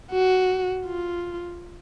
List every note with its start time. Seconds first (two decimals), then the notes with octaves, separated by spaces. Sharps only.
0.11 F#4
0.86 F4